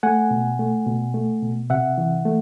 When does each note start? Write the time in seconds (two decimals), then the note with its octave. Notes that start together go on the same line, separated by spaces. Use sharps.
0.03 A3 F#5 G#5
0.31 B2
0.59 A3
0.87 B2
1.14 A3
1.42 B2
1.70 C3 E5 F#5
1.98 E3
2.25 A3